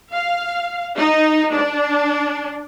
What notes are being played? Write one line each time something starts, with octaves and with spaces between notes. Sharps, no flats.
F5
D#4
D4